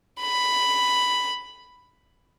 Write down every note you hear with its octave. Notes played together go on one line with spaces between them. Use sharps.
B5